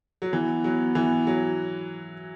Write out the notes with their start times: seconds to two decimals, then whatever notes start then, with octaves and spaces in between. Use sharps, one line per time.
0.22 F#3
0.33 E3 B3
0.64 F#3
0.95 E3
1.27 F#3